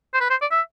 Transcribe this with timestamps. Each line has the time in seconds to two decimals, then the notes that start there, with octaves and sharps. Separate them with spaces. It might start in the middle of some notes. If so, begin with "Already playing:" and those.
0.14 C5
0.21 B4
0.30 C5
0.41 D5
0.51 E5